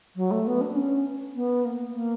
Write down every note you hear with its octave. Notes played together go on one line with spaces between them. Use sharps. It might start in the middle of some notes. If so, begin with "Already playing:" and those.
F#3
A3
B3
D4
C#4
B3
A#3
A#3